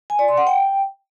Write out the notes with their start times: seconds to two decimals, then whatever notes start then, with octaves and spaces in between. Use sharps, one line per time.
0.10 G#5
0.19 D5
0.28 C6
0.37 F#5
0.47 G5